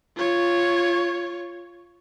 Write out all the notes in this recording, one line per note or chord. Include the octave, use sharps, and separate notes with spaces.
F4 C#5